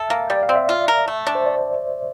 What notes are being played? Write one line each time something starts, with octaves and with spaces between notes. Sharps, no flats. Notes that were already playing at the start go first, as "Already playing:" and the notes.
Already playing: A4 E5
A#3
G3 D5
F5
C4
E5
F4
A#4
A3
D4
C5
D5